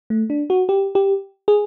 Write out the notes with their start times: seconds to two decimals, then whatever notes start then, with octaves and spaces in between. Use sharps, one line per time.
0.10 A3
0.30 D4
0.50 F#4
0.69 G4
0.95 G4
1.48 G#4